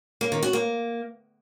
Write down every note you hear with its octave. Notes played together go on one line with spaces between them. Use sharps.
A#3
D#3
F#4
A#3